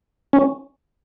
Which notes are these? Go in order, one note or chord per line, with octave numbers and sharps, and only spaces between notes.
C#4